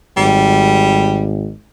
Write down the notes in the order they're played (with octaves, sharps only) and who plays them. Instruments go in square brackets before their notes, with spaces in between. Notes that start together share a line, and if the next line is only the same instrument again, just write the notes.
[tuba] G#1 [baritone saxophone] G3